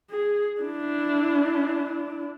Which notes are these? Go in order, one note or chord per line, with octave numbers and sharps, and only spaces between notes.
G#4
D4 E4